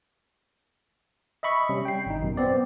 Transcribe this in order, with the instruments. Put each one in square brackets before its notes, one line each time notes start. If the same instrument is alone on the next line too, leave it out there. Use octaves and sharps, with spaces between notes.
[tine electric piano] D#5 E5 B5 C#6
C3 G3 C#4
G5 C7
G#1 D#4
F#2 B2
B3 C4 D5